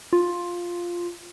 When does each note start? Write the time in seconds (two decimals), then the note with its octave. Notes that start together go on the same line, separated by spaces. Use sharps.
0.13 F4